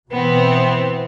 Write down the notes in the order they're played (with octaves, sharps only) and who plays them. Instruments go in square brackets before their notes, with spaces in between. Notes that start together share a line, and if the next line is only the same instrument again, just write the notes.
[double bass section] B2 E3 [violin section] B3 C4